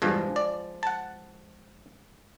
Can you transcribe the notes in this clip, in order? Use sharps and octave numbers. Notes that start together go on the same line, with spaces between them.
E2 G2 B2 F3 G#3
D5
F#5 A5